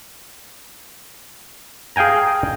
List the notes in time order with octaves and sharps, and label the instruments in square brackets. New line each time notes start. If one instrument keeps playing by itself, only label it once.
[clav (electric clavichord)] G#4 F5 G5 G#5 A#5